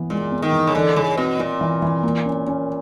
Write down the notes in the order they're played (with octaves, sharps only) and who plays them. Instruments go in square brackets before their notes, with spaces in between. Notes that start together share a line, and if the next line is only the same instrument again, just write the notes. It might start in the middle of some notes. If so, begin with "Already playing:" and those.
Already playing: [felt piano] E3 B3
[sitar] A#2 [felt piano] G#3
[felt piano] B3
[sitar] D#3
[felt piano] E3
[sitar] C#3
[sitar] D3 [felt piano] E3
[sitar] C#3 [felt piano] E3
[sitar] B2 [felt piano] C4
[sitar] A#2 [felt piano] C4
[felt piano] E3
E3
A#3
C#4
C#4